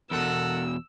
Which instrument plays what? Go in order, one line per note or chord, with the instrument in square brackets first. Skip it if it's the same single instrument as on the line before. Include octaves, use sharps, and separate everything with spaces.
[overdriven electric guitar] E2 B2 [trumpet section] A4 A#4 F#5 [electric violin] E6